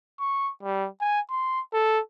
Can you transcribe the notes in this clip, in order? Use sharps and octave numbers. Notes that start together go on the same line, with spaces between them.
C#6
G3
G#5
C6
A4